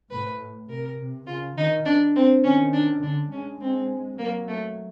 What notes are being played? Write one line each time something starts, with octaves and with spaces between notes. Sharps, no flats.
A2 B4
C3 A#4
C3
C#3 F4
D#3 D#4
D4
C4
D#3 C#4
D4
D3 D4
G#3 C#4
G#3 C4
F#3 A#3
A3